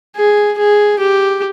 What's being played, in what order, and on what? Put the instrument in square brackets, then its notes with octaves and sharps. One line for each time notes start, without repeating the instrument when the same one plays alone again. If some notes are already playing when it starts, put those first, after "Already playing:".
[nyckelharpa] G#4
G#4
G4